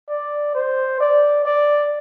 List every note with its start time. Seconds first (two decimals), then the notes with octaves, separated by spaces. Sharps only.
0.09 D5
0.55 C5
1.00 D5
1.45 D5